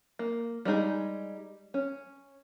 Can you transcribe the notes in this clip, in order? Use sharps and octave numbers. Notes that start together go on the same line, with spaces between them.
A#3
G3 G#3 D#4 G#4
C#4